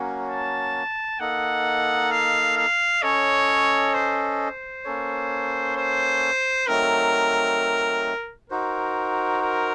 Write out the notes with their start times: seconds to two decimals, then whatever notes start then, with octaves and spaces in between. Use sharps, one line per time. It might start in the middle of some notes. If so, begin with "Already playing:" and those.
Already playing: F#3 A#3 C#4 F#4
0.28 A5
1.20 A#3 D#4 A4 D#5 F#5
2.11 F5
2.57 F5
3.02 C#4 A4 C#5 D#5
3.94 C5
4.85 A#3 C#4 A4 C#5
5.76 C5
6.67 F#3 A3 C4 D#4 A#4
8.50 D#4 F#4 A#4 C5
9.42 A#4